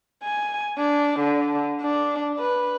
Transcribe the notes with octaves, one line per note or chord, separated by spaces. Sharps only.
G#5
D4
D3
D4
B4